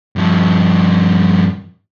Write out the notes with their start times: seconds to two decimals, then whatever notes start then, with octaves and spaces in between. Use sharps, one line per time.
0.16 G2 F3